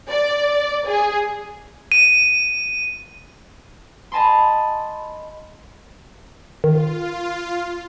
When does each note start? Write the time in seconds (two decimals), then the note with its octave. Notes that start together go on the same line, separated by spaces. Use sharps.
0.10 D5
0.87 G#4
1.92 D#7
4.12 D#5 G#5 A5 B5 C6
6.64 D#3 F4